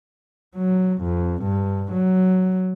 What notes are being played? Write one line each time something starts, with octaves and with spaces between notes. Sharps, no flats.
F#3
F2
G2
F#3